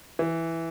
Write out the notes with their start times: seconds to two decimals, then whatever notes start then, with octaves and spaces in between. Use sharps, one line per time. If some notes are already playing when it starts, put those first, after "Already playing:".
0.19 E3